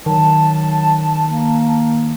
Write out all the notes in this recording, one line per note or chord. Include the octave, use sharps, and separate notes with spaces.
D#3 F#3 A5
A#3